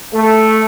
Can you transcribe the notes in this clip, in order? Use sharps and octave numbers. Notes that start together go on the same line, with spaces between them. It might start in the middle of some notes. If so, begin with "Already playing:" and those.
A3